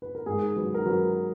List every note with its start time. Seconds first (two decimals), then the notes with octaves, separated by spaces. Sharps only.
0.02 B4
0.15 A#4
0.26 G#2 G#4
0.56 F#3 B4
0.74 A#4
0.86 F#3 B4